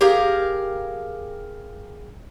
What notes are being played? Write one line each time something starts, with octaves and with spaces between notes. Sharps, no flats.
G4 G#4 A#4 F5